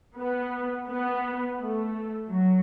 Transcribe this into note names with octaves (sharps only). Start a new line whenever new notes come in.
B3
B3
A3
F#3